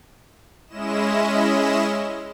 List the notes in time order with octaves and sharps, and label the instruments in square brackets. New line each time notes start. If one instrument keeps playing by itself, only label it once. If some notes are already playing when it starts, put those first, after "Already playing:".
[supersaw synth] G#3 C#4 E4 D#5 E7